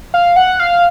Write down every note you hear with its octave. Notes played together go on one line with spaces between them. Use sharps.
F5
F#5
F5